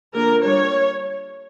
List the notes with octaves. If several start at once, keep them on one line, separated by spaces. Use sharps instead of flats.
D3 F3 A#3 D4 A#4
G3 D4 C#5